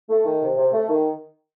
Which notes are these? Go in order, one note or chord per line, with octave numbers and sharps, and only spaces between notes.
A3
D#3
C3
C3
A3
D#3